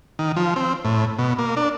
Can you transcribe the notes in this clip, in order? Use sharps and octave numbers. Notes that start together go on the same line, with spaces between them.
D#3
F3
C4
A2
B2
A#3
D4